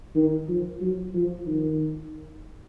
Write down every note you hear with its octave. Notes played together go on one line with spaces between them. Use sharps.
D#3
F3
F#3
F3
D#3